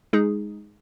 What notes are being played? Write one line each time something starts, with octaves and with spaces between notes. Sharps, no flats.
G#3 D#4 G#4